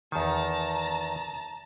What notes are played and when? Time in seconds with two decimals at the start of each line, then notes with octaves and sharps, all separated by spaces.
0.12 E2 D#3 A5 A#5